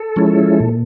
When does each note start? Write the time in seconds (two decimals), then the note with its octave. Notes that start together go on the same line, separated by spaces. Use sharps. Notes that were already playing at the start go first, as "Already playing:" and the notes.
Already playing: A4
0.16 F3 G#3 C#4 E4
0.60 A#2